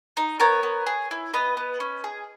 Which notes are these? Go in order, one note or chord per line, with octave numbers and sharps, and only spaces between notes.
D#4
B3 A#4 C#5
B3
G#4
E4
B3 B4 D#5
B3
C#4
G#4